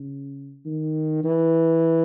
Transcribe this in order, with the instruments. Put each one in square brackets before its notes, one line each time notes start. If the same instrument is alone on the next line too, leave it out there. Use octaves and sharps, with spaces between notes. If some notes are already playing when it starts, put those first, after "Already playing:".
Already playing: [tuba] C#3
D#3
E3